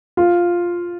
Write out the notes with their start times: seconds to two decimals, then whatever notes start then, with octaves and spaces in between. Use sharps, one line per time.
0.17 F4